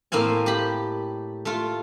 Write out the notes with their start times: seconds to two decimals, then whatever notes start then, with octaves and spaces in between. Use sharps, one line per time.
0.12 A2 A#3 C4 F5 G#5
0.46 G4 B5
1.45 A3 F4